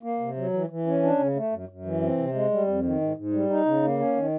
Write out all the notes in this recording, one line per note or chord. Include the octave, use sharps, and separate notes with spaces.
A#3
C3
F#3
E3
E3
C#4
D4
C#3
A3
F#2
F#2
E3
C4
C3
G#3
G3
F2
D#3
G#2
G#2
G3
D#4
C#3
A#3
C#4
D#3